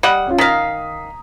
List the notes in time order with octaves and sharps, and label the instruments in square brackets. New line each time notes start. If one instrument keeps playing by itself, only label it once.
[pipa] G3 D#5 F#5
[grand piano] C#4 F4
[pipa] D#3 F5 [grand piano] A#5 D#6 B6